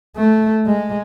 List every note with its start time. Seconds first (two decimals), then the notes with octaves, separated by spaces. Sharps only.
0.17 A3
0.66 G#3